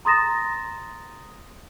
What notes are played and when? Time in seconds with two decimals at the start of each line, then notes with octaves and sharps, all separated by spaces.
0.05 A#5 C6 D#6 A6 A#6 E7